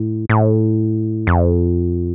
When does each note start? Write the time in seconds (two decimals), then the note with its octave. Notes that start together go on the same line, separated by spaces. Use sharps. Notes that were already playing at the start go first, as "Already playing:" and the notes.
Already playing: A2
0.29 A2
1.27 F2